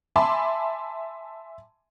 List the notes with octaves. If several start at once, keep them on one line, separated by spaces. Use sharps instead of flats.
E5 G#5 A5 B5 C6 D6